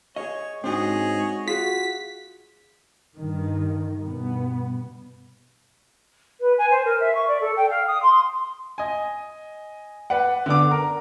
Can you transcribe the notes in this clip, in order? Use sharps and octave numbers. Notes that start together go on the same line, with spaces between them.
G#4 C#5 D#5
G#2 C4 D4 F#4 G#4 C#5 D#5
F4 F#4 G#4 B6
G2 D#3
G2 B2 B3
B4
G#5
C5
A#4
E5
C#6
D5
A4
G5
F5
D#6
C6
D#5 G#5
B4 D5 F#5
D3 B3 D4 D6
A#4